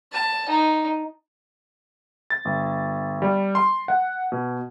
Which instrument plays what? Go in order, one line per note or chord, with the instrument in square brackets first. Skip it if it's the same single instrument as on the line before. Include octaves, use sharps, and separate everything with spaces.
[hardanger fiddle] A5
D#4
[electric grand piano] A6
G1
G3
C6
F#5
B2